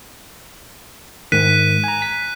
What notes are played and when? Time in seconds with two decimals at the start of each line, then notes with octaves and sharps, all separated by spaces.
1.32 G#2 D#3 F#6 B6 D#7
1.84 G#5 A#5
2.02 B6